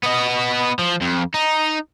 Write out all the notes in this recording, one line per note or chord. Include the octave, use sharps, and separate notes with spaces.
B3 D#5
F3
F2
D#4